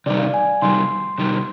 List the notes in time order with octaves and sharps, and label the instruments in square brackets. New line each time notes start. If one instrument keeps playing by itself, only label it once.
[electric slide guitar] C3 D#3 G3 [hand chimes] D5
[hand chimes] F5
G#5
[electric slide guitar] C3 D#3 G3 [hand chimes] C6
[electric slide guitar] C3 D#3 G3